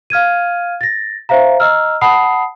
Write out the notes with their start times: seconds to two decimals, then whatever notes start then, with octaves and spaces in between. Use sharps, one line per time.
0.10 F5 F6 G#6 D#7
0.81 A6 A#6
1.29 C5 E5 F5 A#5
1.60 D#5 A#5 E6 F6
2.01 F#5 A5 B5 D#6 C7